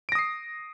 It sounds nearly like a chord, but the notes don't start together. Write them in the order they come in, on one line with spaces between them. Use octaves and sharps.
D7 A#6 D#6 C7